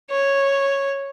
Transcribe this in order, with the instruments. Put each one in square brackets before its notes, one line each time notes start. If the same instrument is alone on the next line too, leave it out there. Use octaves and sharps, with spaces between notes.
[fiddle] C#5